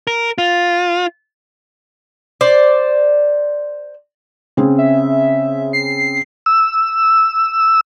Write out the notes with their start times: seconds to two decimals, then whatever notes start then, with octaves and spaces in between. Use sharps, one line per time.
0.07 A#4
0.38 F4
2.41 C5 D5
4.57 C#3 C4 G#4
4.78 E5
5.73 C7
6.46 E6